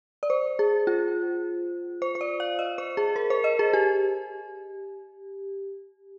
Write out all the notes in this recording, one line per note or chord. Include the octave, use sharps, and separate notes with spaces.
D5
C5
G#4
F4
C5
C5
D5
F5
D#5
C5
G#4
A#4
C5
D#5
G#4
G4